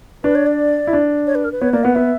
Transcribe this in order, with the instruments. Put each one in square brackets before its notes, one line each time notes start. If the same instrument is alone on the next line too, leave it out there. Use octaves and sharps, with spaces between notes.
[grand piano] D4 [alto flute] B4
[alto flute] C#5
D5
[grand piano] E4
D4
[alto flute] C#5
B4
A#4
B4
[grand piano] B3 [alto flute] C#5
[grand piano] A#3 [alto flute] D5
[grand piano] B3 [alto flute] F#5
[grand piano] B3 [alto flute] E5